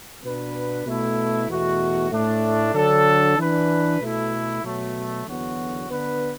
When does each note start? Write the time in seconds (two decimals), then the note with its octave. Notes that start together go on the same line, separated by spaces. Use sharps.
0.23 B2 B3 D4 B4
0.84 B2 A3 E4
1.48 E2 B2 A3 F#4
2.10 A2 A3 D4
2.74 D3 F#3 D4 A4
3.37 E3 D4 B4
3.99 B2 A3 E4
4.63 B2 F#3 A3
5.25 E2 D3 F#3 B3 F#4
5.88 D3 B3 D4 B4